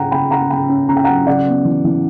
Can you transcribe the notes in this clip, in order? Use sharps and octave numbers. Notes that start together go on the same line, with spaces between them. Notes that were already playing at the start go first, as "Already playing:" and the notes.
Already playing: C#3 C#4 F#5 G5 A#5
C#3 G5 B5
C#3 F#5 A#5
C#3 G5 B5
C#4
C#3 A#5
G5
F#3 F#5 A#5
C#3 D5 F#5
B3
E3
E3